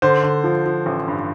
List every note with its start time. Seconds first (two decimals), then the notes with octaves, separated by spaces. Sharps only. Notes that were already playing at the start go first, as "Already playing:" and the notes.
0.02 D3 C5
0.23 D3
0.44 F3
0.65 F3
0.86 A1
1.07 G2